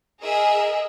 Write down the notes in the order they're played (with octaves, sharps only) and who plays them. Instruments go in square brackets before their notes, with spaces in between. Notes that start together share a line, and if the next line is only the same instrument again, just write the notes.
[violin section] G#4 A#4 D#5 E5